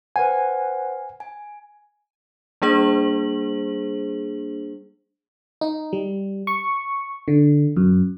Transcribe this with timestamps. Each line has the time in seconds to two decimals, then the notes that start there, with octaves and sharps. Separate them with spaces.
0.16 B4 C5 F#5 G#5
1.20 G#5
2.62 G3 A#3 D4 G#4 C5 F#7
5.61 D#4
5.93 G3
6.47 C#6
7.28 D3
7.77 F#2